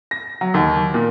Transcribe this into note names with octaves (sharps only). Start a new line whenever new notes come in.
A#6
F#3
D#2
A#2